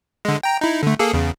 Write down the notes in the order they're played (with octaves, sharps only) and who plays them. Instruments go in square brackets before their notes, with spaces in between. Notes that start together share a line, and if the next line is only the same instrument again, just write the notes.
[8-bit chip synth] D3 G#3
G5 A#5
D#4 E4
D3 A3
A#3 G#4 A4
E2 C#3